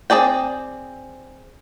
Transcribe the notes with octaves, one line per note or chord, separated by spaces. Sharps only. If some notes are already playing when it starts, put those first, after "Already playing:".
C4 D4 G#4 D5 G5